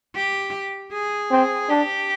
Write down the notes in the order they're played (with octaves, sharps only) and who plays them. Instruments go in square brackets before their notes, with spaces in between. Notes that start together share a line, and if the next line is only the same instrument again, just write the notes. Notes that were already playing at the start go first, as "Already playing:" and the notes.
[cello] G4
G#4
[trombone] C4
[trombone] D4 [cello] G4